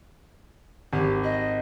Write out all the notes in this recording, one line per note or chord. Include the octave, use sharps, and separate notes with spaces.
G#1 G4
D#5